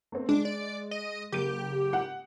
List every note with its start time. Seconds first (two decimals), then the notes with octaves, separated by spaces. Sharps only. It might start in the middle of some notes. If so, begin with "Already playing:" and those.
0.12 A3 B3 C4
0.29 G#3 D4
0.45 D5
0.91 D#5
1.32 F#1 A#3 G4 D7
1.93 F#5